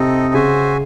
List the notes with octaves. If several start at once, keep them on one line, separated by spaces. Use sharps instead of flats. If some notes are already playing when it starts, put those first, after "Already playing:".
Already playing: C3 C4 D#4 A4 D#5
C#3 F#4 C5 E5 G#5